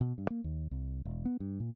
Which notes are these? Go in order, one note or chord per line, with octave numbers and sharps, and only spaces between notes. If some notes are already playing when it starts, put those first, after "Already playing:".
B2
G2
A#3
D#2
C2
E1
B3
G2
A#2